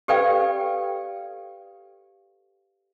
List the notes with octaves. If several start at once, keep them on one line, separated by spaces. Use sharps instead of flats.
G4 A4 B4 D5 F5 G5